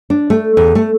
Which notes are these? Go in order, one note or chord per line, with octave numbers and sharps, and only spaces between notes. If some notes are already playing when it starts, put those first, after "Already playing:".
D4
A3
E2
A3